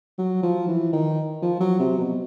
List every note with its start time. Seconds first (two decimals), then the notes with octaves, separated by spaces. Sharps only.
0.18 F#3
0.43 F3
0.68 E3
0.93 D#3
1.42 F3
1.60 F#3
1.79 C3
1.98 B2